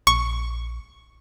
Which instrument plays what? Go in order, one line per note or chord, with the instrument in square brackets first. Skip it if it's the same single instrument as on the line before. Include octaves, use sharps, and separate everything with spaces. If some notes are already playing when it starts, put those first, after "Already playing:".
[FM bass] A#1 [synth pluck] C#6